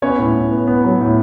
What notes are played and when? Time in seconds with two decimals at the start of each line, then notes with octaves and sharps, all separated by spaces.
0.02 B3 C#4 C#5
0.18 A2
0.34 A2
0.51 B3
0.67 B3
0.84 F#3
1.01 A2